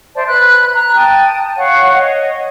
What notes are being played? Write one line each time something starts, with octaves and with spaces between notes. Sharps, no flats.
C5 D5 E5 A5
B4 B5 F#6
A#5 F#6
G5 A5 D#6
C#5 F5 F#5 C#6
C#5 D#5